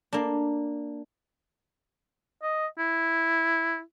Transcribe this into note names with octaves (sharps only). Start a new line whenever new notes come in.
A#3 D4
D#5
E4